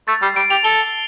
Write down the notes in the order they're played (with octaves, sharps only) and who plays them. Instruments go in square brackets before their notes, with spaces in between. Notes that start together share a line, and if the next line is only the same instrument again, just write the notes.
[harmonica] A3 [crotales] A6
[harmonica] G3 [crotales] C7
[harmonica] G3 [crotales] D7
[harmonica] G4 [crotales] F7
[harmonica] A4 [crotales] G7